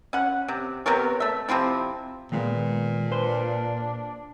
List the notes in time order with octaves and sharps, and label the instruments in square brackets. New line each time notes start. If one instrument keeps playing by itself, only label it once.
[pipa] C#4 F#5
C3
C3 B3 A#4 C#5
A3 E5
C3 F3 C4 E4
[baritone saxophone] A#2 [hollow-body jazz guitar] D#3 G#3 B3
[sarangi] D4 [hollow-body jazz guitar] B4 C5